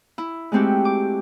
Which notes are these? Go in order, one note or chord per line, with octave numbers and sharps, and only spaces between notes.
E4
G#3 A3 C4 F#4 G4
D6